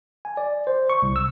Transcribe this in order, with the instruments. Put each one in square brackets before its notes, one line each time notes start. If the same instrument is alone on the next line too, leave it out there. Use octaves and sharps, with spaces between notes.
[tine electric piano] G#5
D5
C5
C#6
C2
E6